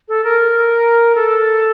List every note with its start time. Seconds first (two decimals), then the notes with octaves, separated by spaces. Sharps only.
0.09 A4
0.24 A#4
1.15 A4